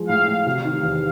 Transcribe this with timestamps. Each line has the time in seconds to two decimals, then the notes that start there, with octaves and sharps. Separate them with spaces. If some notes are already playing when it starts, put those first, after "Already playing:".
Already playing: F3 G#3
0.08 A2 F5
0.28 A2
0.46 C3 F5
0.65 D#3
0.83 E2